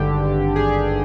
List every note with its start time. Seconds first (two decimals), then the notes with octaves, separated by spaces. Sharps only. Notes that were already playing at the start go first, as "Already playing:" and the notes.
Already playing: G#1 G2 D3 G4
0.56 G#4